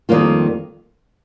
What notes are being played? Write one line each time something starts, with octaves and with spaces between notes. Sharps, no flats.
F2 D#3 G3 A#3 F4